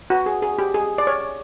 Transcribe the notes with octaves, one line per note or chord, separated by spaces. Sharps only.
F#4
G#4
G#4
G4
G#4
D5
C#5